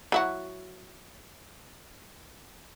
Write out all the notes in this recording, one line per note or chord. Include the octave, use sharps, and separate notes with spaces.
F#3 E4 F#4